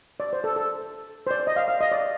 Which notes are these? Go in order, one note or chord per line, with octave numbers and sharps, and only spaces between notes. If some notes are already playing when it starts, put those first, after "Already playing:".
D5
C5
A4
A4
C5
D5
D#5
F5
F5
D#5
D5